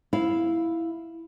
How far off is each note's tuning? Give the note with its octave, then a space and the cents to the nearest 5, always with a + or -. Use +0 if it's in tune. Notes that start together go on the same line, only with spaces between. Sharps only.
E4 +0 F5 +0